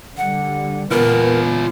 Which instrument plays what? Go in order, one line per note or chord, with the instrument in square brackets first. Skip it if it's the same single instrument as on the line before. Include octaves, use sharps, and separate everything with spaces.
[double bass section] D3 G3 [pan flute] F#5
[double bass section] A#2 E3 B3 [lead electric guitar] F4 B4 [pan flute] A#4